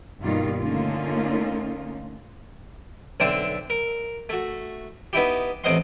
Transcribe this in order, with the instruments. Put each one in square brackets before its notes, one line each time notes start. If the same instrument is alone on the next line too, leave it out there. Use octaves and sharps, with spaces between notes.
[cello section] G2 B2 D#3 G3 A#3 F4
D3 A3 A#3 C#4 D#4 F4
[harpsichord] B1 D3 C4 D4 C5 E5
A#4
A3 F#4
B3 D#4 E4 G4
A1 C3 C5 D#5 F#5 C6